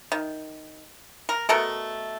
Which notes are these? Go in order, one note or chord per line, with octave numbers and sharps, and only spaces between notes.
D#3
A#4
B2 A3 A4 A#4